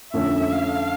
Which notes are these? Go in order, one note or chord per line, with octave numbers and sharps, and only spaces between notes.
F2 D3 A3 C#4 E5
F5